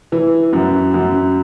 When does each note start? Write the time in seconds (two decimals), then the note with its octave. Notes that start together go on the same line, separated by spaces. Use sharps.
0.12 E3
0.53 F#2
0.94 F#2